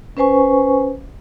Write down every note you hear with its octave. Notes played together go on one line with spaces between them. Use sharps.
C#4 B4 C5 G#5 C#6